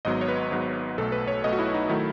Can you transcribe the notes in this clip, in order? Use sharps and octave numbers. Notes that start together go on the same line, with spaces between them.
G#1 G#2 F#3 B3 D#5
C#5
B4
G#1 G#2 F#3 B3
B1 B2 A3 A4
B4
C#5
B1 B2 A3 D#5
F#4
E4
D#4
D#3 F#3 A3 E4